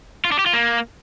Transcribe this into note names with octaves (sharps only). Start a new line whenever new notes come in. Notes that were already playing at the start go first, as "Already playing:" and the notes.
F4
D4
G4
F4
A#3